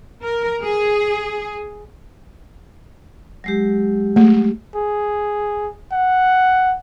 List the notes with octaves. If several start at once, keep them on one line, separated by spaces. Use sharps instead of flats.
A#4
G#4
F#3 G#3 G4
A3
G#4
F#5